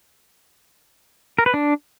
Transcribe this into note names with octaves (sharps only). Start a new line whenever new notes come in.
A#4
B4
D4